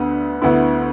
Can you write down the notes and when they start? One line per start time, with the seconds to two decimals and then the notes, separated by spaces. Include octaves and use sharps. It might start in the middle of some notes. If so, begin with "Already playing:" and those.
Already playing: D2 D3 B3
0.42 D2 D3 B3 E4